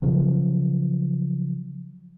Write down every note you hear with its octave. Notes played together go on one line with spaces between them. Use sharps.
C#3 F3 F#3